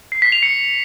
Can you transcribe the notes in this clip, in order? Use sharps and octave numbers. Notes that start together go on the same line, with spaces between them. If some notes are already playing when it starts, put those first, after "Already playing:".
C7
B6
F7
C#7